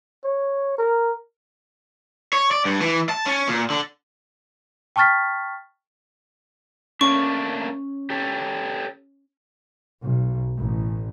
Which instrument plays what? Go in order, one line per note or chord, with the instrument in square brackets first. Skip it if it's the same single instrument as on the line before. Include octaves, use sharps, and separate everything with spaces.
[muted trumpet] C#5
A#4
[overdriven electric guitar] C#5
D5
G2
E3
A5
C#4
A#2
D3
[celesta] G5 A5 C#6 F6 A6 B6
[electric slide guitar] A3 A#3 D4 [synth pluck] C#4 [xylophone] C#6
[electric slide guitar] G4 A4 C#5
[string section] B1
A1